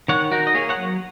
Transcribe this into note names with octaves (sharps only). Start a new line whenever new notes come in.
D#3 C#5 F#5
D#4 F#4 A#4
D#5
A#3 G#4 C#5
C#5 F#5
F#3